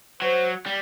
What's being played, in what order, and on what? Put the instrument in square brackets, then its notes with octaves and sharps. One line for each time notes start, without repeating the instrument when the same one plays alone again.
[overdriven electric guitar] F#3 [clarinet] C5
[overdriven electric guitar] G3